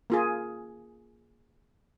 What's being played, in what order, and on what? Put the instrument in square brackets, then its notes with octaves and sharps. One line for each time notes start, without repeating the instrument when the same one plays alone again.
[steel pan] A#3 F4 G#4